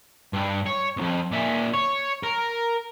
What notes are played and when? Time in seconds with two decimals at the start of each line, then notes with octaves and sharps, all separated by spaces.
0.33 G2
0.66 C#5
0.97 C2 F2
1.32 A#2 E5
1.74 C#5
2.23 A#4